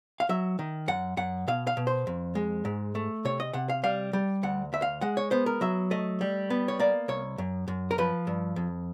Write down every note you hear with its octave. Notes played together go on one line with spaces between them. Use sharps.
F5
F#3 E5
D#3
F#2 F#5
F#2 F#5
B2 F5
F5
B2
C5
F2
G#3
G#2
A3
C3 C#5
D#5
C3 F#5
F5
G3 F5
G3
D2 F#5
D2 E5
F5
G#3 F#5
C#5
B3 C5
A#4
F#3 E5
A3 D#5
G3
B3
C#5
A#3 D5
C2 C#5
F#2
F#2
A#4
F3 B4
G2
F2